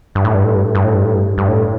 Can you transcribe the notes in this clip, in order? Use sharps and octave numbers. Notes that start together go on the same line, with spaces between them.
G2
A2
G2
A2
G2
A2
G2
A2
G2
A2
G2
G2
A2